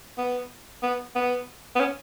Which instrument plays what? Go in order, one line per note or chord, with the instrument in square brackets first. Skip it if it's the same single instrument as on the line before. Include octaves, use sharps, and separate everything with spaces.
[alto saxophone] B3
B3
B3
B3
C#4